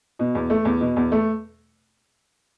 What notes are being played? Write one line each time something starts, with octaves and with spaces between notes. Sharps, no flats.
B2
E2
A3
E2
B2
E2
A3